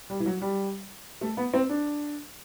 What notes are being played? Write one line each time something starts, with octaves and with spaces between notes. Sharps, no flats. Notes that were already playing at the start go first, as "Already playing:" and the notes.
G3
E3
F#3
G3
A3
B3
C4
D4